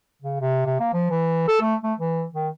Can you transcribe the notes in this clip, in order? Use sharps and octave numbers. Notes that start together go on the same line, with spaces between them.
C#3
C3
C3
A#3
F3
E3
A4
A3
A3
E3
D#3